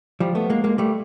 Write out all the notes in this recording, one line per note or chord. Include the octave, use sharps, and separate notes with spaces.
F3 G3
A3 B3
G#3 A#3
G#3 A#3
G3 A3